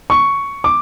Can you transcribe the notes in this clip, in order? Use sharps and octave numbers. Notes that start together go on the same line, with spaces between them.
C#6
D6